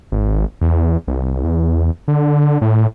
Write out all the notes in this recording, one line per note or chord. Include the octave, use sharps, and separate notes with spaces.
G#1
E2
C2
E2
D3
A2